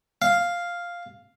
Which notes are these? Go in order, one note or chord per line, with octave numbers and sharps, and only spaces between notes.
F5